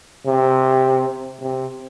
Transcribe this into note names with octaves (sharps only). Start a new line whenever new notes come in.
C3
C3